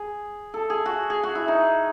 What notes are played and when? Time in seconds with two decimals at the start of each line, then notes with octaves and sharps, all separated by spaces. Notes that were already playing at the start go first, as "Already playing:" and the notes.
Already playing: G#4
0.54 A4
0.70 G#4
0.86 F#4
1.10 G#4
1.23 F#4
1.35 E4
1.48 D#4